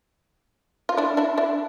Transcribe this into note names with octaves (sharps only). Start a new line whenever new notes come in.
F4
D4 E4
D4 E4
D4 E4